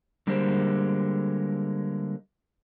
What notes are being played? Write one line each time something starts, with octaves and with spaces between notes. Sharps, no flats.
D3 G3 G#3 A#3 G4 C5